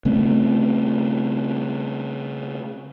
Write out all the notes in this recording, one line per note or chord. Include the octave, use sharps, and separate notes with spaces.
C#3 A3 B3 C4